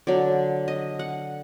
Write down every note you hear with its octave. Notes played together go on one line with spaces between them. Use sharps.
D3 F#3 D4 D5
D#5
F#5